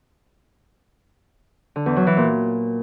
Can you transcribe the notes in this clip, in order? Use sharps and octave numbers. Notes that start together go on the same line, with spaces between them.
D3
E2
F#3
E3
A#2